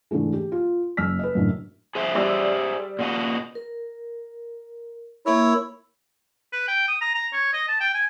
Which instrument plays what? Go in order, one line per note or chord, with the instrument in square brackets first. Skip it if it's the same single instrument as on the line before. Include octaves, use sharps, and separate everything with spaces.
[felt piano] G#2 D3 E3 G#3 A3
G4
F4
F#1 E6 F6 B6
B4 D#5
F#2 A2 D3
[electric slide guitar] G#4 C5 E5
[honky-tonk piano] G3 D5 E6
[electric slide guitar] A#2 F#4 D#5
[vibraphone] A#4
[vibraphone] A#3 A#4 E6 [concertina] E4 C#5
[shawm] B4
G5
D#6
A#5
A#5
C#5
D#5
A5
G5
G#5